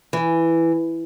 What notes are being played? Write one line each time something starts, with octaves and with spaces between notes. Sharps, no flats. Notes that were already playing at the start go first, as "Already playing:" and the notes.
E3